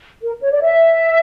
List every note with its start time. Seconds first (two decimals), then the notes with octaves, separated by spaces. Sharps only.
0.22 A#4
0.41 C#5
0.51 D5
0.62 E5